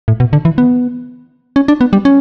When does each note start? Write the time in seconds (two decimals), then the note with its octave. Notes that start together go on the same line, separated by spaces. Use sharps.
0.08 A2
0.20 B2
0.33 D3
0.45 E3
0.58 B3
1.56 C#4
1.68 D4
1.81 B3
1.93 G3
2.05 C#4